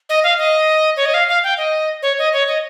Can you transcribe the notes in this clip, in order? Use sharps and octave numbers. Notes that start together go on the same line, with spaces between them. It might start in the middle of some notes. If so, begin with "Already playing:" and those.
D#5
F5
D#5
C#5
D#5
F5
F5
G5
D#5
C#5
D#5
C#5
D#5